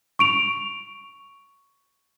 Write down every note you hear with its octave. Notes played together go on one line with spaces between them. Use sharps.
C#6 D7 F7